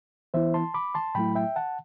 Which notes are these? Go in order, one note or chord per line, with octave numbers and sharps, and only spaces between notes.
E3 B3 E4 C5 E5
A5 C6
B5 D6
A5 C6
A2 F#3 A3 E4 G5 B5
E5 G5
F#5 A5